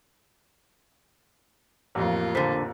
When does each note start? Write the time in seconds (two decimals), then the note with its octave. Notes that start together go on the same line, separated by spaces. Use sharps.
1.95 A1 F2 A#3 F4
2.35 A#2 D3 A4 C5 B6